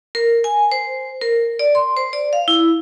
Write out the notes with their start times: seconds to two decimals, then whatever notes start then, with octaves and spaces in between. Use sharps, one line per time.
0.15 A#4
0.44 G#5
0.72 C5
1.21 A#4
1.59 D5
1.75 C6
1.97 C5
2.13 D5
2.33 F5
2.48 E4